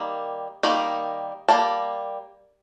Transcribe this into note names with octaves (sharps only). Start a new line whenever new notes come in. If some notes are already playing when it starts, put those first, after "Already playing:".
Already playing: D#3 G3 A#3
D#3 G3 A#3 D#4
G3 A#3 A5